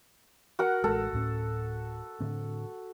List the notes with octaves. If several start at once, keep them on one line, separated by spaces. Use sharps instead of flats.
F#4 A#4 F#5
A1 G#3 A4
D1 A2 C#4
A2 D3 C4